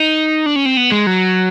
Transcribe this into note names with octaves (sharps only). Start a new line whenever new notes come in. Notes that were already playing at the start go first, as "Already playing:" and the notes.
Already playing: D#4
D4
C#4
C4
B3
G#3
F#3